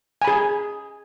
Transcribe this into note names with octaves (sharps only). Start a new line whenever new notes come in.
G#4 G#5 B5